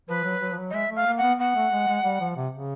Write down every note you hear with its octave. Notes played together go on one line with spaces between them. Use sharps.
F3 B4
F#3
F#3
F3
F#3
D#5
G#3 E5
A3
F5
A#3
F#5
B3
B3 F#5
A3
G#3
G#3
G3
F3
C3
C#3